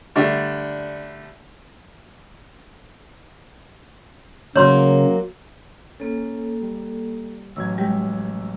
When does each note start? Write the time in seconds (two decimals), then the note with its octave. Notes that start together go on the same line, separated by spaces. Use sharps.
0.16 D3 G3 A3 D4
4.56 C#3 F#3 A#3 C#5 C6
6.00 A#3 C#4 A4
6.61 G3
7.56 A1 F#3 E6 G#6
7.78 G3 G#3 G4